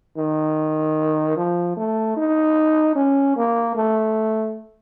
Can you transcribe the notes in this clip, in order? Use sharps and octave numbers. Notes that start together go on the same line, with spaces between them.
D#3
F3
A3
D#4
C#4
A#3
A3